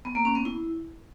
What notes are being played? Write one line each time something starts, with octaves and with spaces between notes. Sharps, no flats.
B3
A#3
C#4
B3
E4